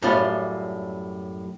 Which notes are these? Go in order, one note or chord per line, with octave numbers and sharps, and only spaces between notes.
F#2 A2 G3 C#4 F4 B5